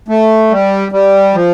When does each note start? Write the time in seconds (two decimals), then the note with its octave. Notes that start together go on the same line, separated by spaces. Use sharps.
0.08 A3
0.51 G3
0.92 G3
1.34 F3